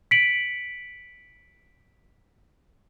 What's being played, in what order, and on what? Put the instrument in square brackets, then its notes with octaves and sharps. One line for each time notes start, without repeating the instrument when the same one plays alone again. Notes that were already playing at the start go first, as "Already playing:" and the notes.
[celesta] B6 C#7 D7 F#7